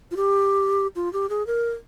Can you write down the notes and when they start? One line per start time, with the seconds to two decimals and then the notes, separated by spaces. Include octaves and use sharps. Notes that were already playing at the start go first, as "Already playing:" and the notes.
0.11 F4
0.16 G4
0.96 F4
1.13 G4
1.30 G#4
1.47 A#4